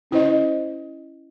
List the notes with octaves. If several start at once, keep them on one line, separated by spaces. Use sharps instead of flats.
C#4 E4 C5 D#5